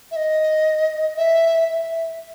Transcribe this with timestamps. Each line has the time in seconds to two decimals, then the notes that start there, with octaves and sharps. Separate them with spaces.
0.11 E5
0.16 D#5
1.17 E5
1.70 E5